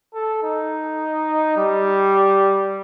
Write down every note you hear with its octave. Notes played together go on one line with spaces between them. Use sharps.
A4
D#4
G3